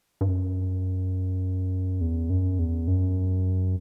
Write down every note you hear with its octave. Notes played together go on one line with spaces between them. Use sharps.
G2
F#2
E2
F#2
E2
F#2